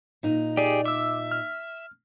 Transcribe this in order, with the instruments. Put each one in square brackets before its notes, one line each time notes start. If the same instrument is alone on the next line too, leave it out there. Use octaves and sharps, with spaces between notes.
[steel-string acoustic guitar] A#2 D#4
[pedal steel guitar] G4 G#4 [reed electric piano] D5
[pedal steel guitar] E5 [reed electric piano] D6 E6
[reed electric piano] F6